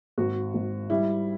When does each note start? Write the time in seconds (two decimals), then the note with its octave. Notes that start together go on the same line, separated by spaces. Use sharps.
0.18 G#1 F#4
0.54 G#1
0.90 G3 E4